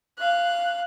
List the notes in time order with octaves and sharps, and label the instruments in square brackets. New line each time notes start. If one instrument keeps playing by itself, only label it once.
[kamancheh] F5 F#6